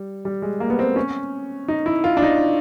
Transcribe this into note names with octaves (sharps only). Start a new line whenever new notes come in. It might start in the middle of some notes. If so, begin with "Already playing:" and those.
Already playing: G3
G3
G#3
A#3
B3
C4
C#4
D#4
E4
F4
D4
D#4